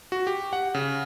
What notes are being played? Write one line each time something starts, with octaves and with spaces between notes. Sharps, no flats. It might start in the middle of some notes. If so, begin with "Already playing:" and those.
F#4
G4
F#5
C#3